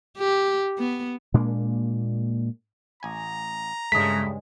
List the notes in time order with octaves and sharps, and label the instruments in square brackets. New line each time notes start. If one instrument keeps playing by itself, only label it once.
[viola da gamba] G4
B3
[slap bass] A#2 G#3 A#3 D4
[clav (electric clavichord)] A1 G#5 [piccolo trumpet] A#5
[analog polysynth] G2 C#3 G#3 [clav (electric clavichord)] A3 D#5 [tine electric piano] B6